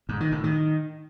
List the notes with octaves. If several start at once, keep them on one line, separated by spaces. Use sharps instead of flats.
G#2
D#3
A2
D#3